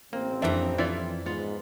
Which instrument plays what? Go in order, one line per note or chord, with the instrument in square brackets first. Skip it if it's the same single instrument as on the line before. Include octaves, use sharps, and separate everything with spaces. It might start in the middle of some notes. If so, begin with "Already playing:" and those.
[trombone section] A1 C4 [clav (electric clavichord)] A#3
[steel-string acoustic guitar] F2 G4 A#5 [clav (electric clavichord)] E3 D4 [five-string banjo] A#3 E5
[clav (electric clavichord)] E3 [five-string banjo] E4 F4 D5
[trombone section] G#2 [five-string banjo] B3 F4